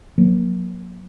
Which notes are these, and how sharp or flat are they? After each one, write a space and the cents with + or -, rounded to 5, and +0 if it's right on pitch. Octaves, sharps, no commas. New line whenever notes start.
F#3 -30 A#3 +20